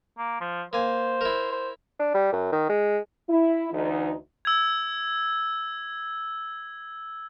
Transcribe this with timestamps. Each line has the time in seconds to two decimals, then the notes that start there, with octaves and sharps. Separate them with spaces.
0.18 A#3
0.41 F3
0.73 A#3 C5 G#5
1.21 E4 A#4
1.52 C5
1.99 D4
2.14 G3
2.32 F#2
2.52 D#3
2.69 G#3
3.29 E4
3.73 D2 E3 D#4
4.45 E6 G#6